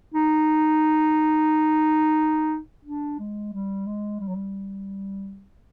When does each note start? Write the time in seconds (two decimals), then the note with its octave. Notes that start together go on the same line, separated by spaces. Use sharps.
0.14 D#4
2.85 D4
3.19 G#3
3.53 G3
3.87 G#3
4.21 G3
4.28 F#3
4.35 G3